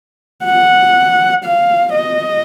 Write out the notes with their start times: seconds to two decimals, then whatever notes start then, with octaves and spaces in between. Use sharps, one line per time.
0.44 F#5
1.44 F5
1.94 D#5